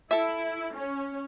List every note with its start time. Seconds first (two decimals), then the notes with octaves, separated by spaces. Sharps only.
0.11 E4 A4 E5
0.74 C#4